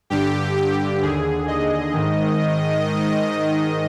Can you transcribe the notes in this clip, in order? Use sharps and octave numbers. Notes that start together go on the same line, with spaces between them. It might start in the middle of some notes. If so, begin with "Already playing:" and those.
G2 D3 G4
G4
D#2 D3 G#4
D#5
G#2 D#3